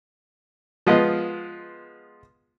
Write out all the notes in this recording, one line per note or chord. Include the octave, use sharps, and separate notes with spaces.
F3 G#3 B3 F4 B4 D#5